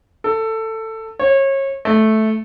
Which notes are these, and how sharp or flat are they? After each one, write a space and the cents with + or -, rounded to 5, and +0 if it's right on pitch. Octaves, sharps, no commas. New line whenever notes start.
A4 +15
C#5 -30
A3 -10